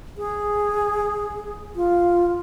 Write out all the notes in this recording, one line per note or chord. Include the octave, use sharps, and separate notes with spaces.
G#4
F4